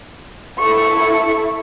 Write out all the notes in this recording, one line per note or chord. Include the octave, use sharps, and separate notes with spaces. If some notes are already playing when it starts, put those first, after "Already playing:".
E4 A4 C#6